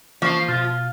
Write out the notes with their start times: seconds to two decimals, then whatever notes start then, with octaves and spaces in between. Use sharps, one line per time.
0.22 E3 F3 A#3 C#4 F5
0.48 B2 F4